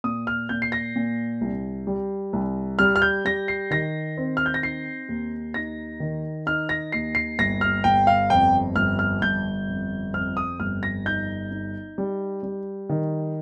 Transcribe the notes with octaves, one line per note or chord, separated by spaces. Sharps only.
A#2 D#6
F6
A#2 G6
C7
A#6
A#2
C2
G3
C2
G3 F6
F6
G6
G3 A#6
C7
D#3 A#6
C4
F6
G6
A#6
D#4 C7
D#2
D#4 A#6
D#3
D#4 F6
A#6
D#2 C7
C7
G1 A#6
F6
G1 G5
F5
F2 G5
G1 F6
F6
G1 G6
F2
F2 F6
D#6
G1 F6
A#6
D#4 G6
D#4
G3
G3
D#3